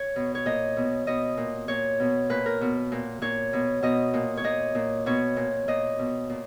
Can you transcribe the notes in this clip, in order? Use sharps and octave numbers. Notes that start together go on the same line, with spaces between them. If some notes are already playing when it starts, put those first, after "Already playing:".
Already playing: C#5
B2
C#5
A#2 D#5
B2
B2 D#5
A#2
A#2 C#5
B2
A#2 B4
A#4
B2
A#2
A#2 C#5
B2
B2 D#5
A#2
C#5
A#2 D#5
A#2
B2 C#5
A#2
A#2 D#5
B2
A#2